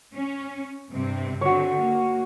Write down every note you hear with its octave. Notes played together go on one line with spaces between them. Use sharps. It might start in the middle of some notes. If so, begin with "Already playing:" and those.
C#4
G2 C3 C4
D3 C4 F#4 C#5
A#3